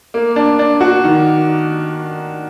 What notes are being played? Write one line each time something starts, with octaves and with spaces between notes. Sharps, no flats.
A#3
D4
D4
F#4
D#3